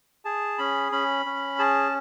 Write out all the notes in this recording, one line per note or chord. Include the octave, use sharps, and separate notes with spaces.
G#4 A5
C#4 B5
C#4 B5
C#4
G#4 A5